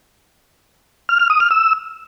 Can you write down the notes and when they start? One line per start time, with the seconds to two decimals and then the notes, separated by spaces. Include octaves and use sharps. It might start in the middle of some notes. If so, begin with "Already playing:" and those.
1.09 F6
1.19 F6
1.30 D#6
1.40 F6
1.51 E6